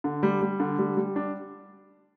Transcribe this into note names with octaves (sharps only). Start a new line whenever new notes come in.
D3
G3
G3
D3
G3
G3
D4